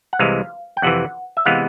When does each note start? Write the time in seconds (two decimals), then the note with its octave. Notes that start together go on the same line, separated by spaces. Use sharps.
0.13 F#5
0.19 C2 C3 E3 G#3 F5
0.77 G5
0.82 F2 C3 E3 F#5
1.37 E5
1.45 C3 E3 G#3 B3 F5